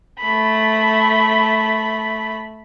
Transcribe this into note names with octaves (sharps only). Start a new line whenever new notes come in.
A3 B5